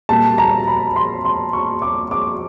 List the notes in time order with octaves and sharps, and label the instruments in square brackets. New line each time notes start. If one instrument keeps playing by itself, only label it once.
[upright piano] A#2 G3 A#3 A5
A#5
B5
C6
C6
C#6
D6
D6